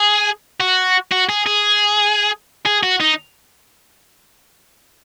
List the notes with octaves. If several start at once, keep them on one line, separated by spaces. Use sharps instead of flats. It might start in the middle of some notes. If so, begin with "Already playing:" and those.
Already playing: G#4
F#4
F#4
G#4
G#4
G#4
F#4
D#4